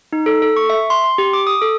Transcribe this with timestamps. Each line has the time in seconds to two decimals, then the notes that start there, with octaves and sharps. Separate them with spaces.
0.13 D#4
0.26 A4
0.42 A4
0.56 C#6
0.70 E5
0.90 C6
1.04 C6
1.18 G4
1.33 D6
1.47 D#6
1.62 A4